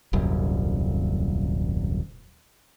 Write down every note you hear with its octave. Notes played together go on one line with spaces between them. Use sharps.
D#1 C2 F#2